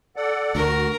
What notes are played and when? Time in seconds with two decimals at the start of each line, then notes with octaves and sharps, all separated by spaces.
0.16 A4 D5 F#5
0.55 D2 F#4 A#4